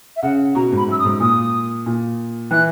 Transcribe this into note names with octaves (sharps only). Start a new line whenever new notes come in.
E5
C#3 F#5
B2 A#5
G#2 B5
F#2 E6
D#6
G#2
A#2 D#6
A#2
E3 F#6